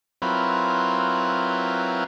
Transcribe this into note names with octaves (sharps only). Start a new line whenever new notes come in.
F#3 C4 E4 F4 A#4 B4